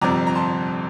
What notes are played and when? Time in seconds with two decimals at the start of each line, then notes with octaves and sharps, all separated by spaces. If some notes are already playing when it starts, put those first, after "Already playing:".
0.01 G1 F2 C3 G3 C4 A#5 D6
0.27 A#5
0.35 A5 C6